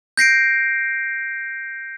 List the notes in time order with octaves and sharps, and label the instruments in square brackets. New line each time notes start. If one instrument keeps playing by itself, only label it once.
[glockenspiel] G6 A#6 C7 D7